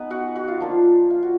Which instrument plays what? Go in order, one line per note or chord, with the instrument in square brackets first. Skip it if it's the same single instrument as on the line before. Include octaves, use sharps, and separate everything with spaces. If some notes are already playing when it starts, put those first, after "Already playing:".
Already playing: [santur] G#3 B3 D#4 B4
F#4 F#5
F#4 F#5
F4 F5
F3 A#3 D4 F4
F4 F5
F#4